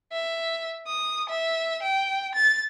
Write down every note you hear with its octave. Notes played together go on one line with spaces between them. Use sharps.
E5
D#6
E5
G5
A6